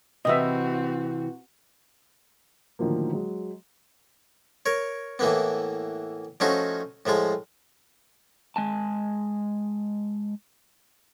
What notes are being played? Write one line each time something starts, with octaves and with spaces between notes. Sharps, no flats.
C3 E3 C4 F#4 D#5 E5
A2 D3 D#3 F3 F#3 A#3
F#3 G#3
A#4 C#5
A2 E3 A#3 B3
F3 A3 C#4 D#4 F4 F#4
A2 F3 G#3 F4
G#3 G#5 A5